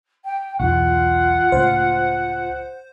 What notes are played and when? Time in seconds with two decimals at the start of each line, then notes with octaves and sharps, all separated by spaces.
0.24 G5
0.60 B1 E2 F4 F#5
1.52 C#2 A2 C5